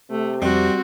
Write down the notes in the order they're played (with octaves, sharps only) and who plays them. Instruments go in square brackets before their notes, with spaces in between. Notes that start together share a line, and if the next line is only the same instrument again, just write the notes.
[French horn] C3 [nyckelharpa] A3
[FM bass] F2 [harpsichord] G3 [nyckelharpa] C4 F#4